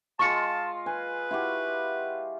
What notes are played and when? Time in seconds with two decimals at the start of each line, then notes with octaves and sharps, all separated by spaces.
0.19 G#3 F4 D#5 A5 C#6 C#7
0.86 B4 G#5
1.31 E4 F#4 G4